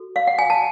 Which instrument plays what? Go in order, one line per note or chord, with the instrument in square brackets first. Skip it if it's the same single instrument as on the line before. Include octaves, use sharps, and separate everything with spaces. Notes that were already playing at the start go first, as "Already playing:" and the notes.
Already playing: [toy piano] F#4 A4
F5
F#5
G#5
A5